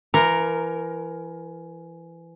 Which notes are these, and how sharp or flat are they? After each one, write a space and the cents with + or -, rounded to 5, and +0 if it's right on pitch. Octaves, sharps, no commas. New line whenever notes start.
E3 +25 A#4 +0